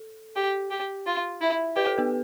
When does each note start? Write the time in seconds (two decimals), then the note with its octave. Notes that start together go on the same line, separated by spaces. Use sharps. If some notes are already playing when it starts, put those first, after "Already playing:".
Already playing: A4
0.36 G4
0.71 G4
1.06 F4
1.41 E4
1.76 G4 B4
1.87 A4
1.98 B3 B4